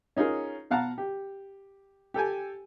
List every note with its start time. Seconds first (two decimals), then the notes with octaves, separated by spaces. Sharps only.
0.16 C#4 D#4 F4 G#4 A#4
0.71 B2 F5 F#5 A5 A#5
0.98 G4
2.14 G4 A4 G5 G#5